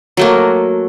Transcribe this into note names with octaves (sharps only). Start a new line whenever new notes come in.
F#3 A3 A#3